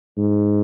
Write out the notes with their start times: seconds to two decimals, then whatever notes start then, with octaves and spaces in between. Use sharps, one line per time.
0.18 G#2